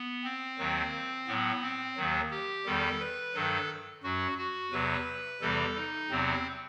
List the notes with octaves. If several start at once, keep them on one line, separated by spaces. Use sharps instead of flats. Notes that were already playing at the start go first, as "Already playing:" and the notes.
Already playing: B3
C4
D#2 D#3 F#3
A2 F#3 B3
C4
D#2 D#3 F#3
G4
E2 D#3 G3 A4
B4
G2 D#3 F#3 A4
F#2 F#3 F#4
F#4
E2 C3 F#3 B4
E2 C3 E3 G3 A4
D#4
E2 C3 F#3 C4